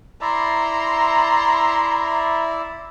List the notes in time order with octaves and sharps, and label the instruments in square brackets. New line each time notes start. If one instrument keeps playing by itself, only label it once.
[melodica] E4 D5 E5 [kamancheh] A#5 C6